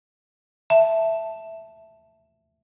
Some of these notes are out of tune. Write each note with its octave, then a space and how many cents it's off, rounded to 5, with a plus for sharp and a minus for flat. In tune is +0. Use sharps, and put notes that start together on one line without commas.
E5 +0 A5 +0